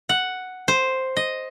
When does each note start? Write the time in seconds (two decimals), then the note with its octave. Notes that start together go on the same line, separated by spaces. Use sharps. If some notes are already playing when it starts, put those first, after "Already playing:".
0.09 F#5
0.68 C5
1.17 D#5